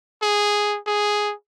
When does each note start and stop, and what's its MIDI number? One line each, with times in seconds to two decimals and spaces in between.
0.22 0.78 68
0.87 1.34 68